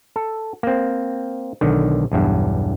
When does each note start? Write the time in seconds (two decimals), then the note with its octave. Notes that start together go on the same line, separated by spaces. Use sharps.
0.16 A4
0.63 A#3 C4
1.61 B1 D3 D#3
2.12 B1 E2 G2